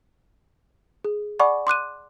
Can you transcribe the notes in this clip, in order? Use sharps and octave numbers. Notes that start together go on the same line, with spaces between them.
G#4
D5 F#5 G#5 B5 C#6 D6
C6 D6 F#6 D#7